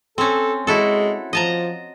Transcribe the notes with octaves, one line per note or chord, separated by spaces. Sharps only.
C4 C#4 A4
G#3 E4 F#4 A4
F3 D#5 A5 A#5